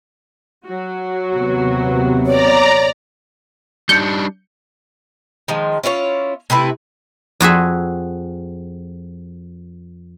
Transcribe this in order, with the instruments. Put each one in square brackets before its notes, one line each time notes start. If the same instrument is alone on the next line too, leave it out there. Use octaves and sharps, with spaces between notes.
[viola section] F#3 F#4
[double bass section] D#2 C3 B3
[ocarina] C#5 [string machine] D5 A#5
[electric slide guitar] G3 D4 D#4 [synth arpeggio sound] G6 C#7
[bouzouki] D#3 F3 G#3
C#4 E4 F4 C#5
C3 A3 E4 B4
[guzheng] F2 F#4 G#4 E5